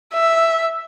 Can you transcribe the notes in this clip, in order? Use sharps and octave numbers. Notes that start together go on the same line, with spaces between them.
E5